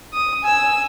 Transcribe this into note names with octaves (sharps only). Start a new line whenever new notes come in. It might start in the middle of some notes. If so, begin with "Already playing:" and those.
D#6
G#5 E6